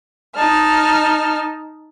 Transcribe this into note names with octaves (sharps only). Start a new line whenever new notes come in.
D#4 A5 F6